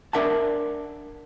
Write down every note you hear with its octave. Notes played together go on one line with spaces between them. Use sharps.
D4 A#4 E5 F#5 A5